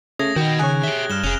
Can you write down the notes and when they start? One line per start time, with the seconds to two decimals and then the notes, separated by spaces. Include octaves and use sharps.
0.19 C#3 A3 D#6 G#6 A#6
0.36 D#3 F#4 D#5 G5
0.59 C#3 G#4 C#5 F#6
0.83 G4 E5 G7
1.10 G2 F6 E7 G7
1.24 F1 C#4 G#4 F7